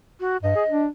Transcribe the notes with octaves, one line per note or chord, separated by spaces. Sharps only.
F#4
G2 D#5
G#4
D4